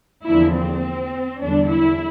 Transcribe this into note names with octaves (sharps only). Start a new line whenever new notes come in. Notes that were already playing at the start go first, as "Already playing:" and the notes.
E2 D3 F3 A#3 E4
C4
E2 D3 G3 D4
E4